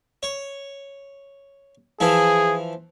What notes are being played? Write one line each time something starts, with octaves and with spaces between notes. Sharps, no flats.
C#5
E3 F3 E4 G#4